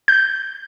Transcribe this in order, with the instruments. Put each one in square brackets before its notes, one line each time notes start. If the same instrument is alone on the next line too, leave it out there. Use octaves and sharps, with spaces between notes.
[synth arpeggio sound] G6